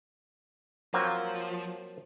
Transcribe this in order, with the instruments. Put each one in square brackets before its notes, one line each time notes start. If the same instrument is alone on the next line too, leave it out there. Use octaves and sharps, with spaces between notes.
[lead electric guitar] F3 [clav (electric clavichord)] F#3 A#3 C4